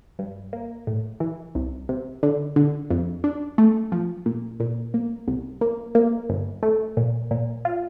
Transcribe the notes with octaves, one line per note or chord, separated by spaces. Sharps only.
G2
A#3
A2
E3
C2
C3
D3
D3
F2
D4
A3
F3
A#2
A#2
A#3
C2
A#3
A#3
G1
A3
A#2
A#2
F4